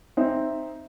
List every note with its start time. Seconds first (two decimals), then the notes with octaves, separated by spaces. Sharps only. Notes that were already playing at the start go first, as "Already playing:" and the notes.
0.17 C4 D#4 E5